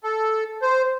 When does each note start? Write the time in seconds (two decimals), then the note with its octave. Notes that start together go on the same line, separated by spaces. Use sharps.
0.03 A4
0.62 C5